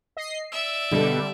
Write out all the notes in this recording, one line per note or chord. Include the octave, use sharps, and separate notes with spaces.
D#5 C7
D5 E5 E6
B2 D3 G3 A4